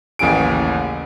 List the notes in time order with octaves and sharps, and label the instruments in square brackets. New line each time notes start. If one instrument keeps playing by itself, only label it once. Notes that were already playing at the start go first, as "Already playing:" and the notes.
[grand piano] A1 D#2 C#3 G#5 D7